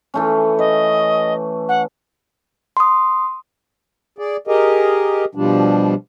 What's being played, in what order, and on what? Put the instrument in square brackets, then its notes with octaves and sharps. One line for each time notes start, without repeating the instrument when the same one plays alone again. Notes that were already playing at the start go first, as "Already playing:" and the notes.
[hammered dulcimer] E3 A3 C#4
[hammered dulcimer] B4 [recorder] D#5
[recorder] F#5
[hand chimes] C6 D#6
[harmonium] G#4 D5
G4 G#4 A#4 D#5
B2 F3 G3 D4